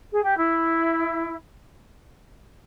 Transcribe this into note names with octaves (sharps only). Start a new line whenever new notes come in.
G#4
G4
E4